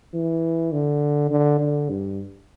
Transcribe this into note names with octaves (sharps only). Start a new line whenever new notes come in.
E3
D3
D3
D3
G2